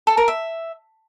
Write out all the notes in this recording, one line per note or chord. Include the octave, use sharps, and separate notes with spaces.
A4
A#4
E5